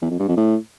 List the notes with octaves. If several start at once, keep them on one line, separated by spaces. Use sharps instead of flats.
E2
F2
G2
F2
A2